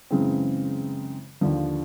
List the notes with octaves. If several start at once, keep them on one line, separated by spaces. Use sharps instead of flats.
F#2 C#3 E3 G#3 C4
D#2 D3 F3